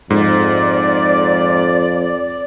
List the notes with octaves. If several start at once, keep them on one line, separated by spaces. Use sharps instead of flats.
F2 G#2 D5